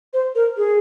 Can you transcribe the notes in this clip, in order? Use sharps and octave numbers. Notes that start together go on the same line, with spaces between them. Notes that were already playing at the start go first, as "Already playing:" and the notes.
C5
A#4
G#4